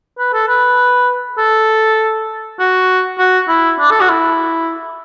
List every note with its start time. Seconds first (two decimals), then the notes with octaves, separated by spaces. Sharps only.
0.18 B4
0.33 A4
0.48 B4
1.38 A4
2.59 F#4
3.18 F#4
3.49 E4
3.80 D4
3.91 A4
4.01 F#4
4.09 E4